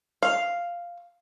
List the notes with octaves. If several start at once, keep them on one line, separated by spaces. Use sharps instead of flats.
F5